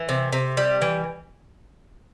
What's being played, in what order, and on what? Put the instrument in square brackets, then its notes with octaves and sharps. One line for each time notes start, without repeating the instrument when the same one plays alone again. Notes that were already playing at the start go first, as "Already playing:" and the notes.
Already playing: [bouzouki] E3
C3
C3
G3
E3